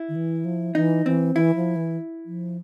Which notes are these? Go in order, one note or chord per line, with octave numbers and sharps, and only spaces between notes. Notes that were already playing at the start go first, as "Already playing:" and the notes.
Already playing: E4
D#3
E3
F3
E3 D#4
E3 C4
E3 E4
F3
E3
F3